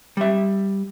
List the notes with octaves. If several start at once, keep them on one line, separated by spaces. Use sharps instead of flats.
G3 E5